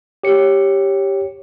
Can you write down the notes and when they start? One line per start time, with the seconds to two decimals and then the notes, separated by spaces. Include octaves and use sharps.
0.23 G4 C#5 C#7